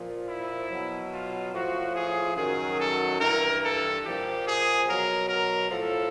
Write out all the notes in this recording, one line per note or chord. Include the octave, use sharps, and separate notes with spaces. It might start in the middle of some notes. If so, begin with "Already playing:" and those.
Already playing: A#2 F3
E4
B2 F#3
F4
A2 F3 F#4
G#4
F#2 D#3 F#3 G#4
A4
G2 E3 A#4
A4
A#2 F3 G4
G#4
B2 F#3 A#4
A#4
A2 F3 A4